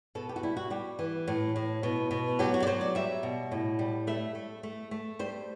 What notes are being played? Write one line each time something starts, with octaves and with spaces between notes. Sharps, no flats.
B2 A4
G4
F#4
G3 E4
F#4
G3 G4
E3
A2
A2
B2
B2
F#3 G4
F#4
D5
F#3 C5
D5
G3 E5
B2
A2
G3
A3 E5
A3
A3
A3
G3 C5